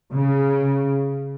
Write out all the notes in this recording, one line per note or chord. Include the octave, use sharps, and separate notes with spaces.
C#3